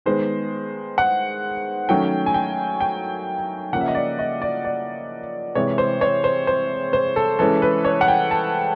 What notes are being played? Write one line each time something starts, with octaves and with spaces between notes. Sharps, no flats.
D#3 G#3 B3 C5
F#5
D#3 F#3 A3 C#4 G5
G#5
G5
G5
C#3 F3 A#3 C#4 F#5
E5
D#5
D5
D#5
D5
D5
C3 E3 G#3 C#5
C5
C#5
C5
C5
C5
A4
E3 G#3 C#4 A4
B4
C#5
F#5
G5
A5